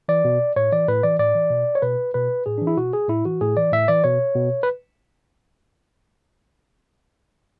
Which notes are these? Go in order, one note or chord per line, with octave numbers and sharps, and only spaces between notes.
E3 D5
B2
A2 C#5
E3 D5
A2 B4
E3 D5
A2 D5
E3
B2
C#5
B2 B4
B2 B4
A2 G#4
E3 D4
E4
B2 F#4
G#4
A2 E4
E3 F#4
A2 G#4
E3 D5
A2 E5
E3 D5
B2 C#5
B2
B4